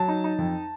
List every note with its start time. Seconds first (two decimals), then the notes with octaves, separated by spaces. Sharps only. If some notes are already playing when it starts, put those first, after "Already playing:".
Already playing: F#3 A5
0.08 D#4
0.24 D#4
0.38 F2